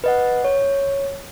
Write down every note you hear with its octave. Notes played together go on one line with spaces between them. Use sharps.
B4 D#5 F#5
C#5